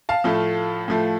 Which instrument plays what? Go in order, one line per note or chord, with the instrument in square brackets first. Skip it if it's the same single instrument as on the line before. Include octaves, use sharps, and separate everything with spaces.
[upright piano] F5 A5
A2 F3 A3
A2 F3 A3